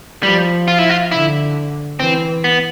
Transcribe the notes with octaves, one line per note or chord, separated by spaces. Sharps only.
F3 G3
F4
E4
F4
D3 E4
E3 C4
B3